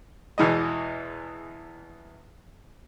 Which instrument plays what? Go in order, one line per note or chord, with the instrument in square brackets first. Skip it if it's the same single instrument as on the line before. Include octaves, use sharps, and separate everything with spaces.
[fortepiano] E2 B2 E3 G#3 D#5